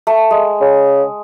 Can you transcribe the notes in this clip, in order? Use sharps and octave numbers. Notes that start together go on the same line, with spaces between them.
A3
G#3
C#3